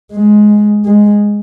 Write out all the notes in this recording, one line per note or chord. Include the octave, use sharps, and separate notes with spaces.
G#3
G#3